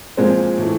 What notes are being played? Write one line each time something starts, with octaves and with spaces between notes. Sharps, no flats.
A#2 F3 G#3 C4
A2 E3 A3